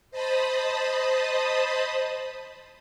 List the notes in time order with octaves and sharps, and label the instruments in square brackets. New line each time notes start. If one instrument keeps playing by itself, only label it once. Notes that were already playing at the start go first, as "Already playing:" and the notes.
[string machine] C5 D#5 A5 B5 D#6